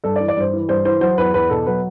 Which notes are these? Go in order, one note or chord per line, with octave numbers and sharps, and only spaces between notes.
G2 A4
D5
E3
D5
G2 C5
E3
G2 C5
E3 C5
F#3 C5
E2 B4
E2 B4
B2 A4
F#3 B4